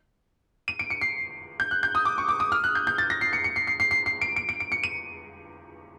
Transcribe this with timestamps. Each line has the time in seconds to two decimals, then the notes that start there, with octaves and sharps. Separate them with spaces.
0.68 D#7
0.79 D7
0.90 C#7
1.01 C7
1.60 G6
1.71 F#6
1.83 G6
1.95 D#6
2.05 D6
2.18 C#6
2.29 D6
2.40 D#6
2.52 F6
2.64 F#6
2.75 G6
2.87 G6
2.98 A6
3.10 A#6
3.21 C7
3.33 C#7
3.44 C#7
3.56 C7
3.67 C7
3.80 C7
3.91 C7
4.06 C7
4.21 D7
4.36 D7
4.49 D7
4.60 D7
4.72 C#7
4.84 D#7